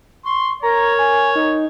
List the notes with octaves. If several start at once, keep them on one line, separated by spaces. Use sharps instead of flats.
C6 C#6
A#4 C#5 A#5
G#5
D#4